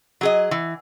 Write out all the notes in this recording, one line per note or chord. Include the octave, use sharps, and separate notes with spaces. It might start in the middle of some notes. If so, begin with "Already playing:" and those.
F#3 G#4 D#5
E3